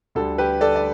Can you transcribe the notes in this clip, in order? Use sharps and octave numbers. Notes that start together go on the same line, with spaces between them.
D2 D3 G3 A4
G4 B4
A4 D5
D5